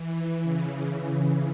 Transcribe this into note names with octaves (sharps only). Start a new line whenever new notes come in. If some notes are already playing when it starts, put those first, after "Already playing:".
Already playing: E3
C#3